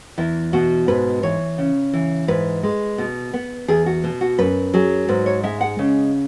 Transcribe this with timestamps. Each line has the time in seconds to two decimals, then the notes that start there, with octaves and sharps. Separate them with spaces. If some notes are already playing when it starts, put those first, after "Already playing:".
0.18 E2 E4
0.53 B2 F#4
0.88 G#2 B4
1.23 E3 C#5
1.58 C#3
1.93 E3
2.28 G#2 B4
2.63 G#3
2.98 B2
3.34 B3
3.68 E2 G#4
3.86 F#4
4.04 B2
4.21 F#4
4.38 F#2 B4
4.74 F#3 G#4
5.08 G#2 B4
5.26 C#5
5.43 G#3 E5
5.61 F#5
5.79 C#3